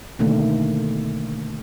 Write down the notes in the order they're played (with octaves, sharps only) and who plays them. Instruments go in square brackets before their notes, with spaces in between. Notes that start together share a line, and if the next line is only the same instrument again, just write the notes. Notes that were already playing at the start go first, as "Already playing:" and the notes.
[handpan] B2 D3 D#3 A3 A#3